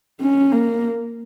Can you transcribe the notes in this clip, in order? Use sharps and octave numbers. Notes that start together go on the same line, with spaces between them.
C#4
A#3